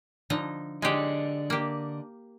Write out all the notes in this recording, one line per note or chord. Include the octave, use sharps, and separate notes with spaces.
D3 F3 D#4
D3 G#3 D4 G4 D#5
A#3 G4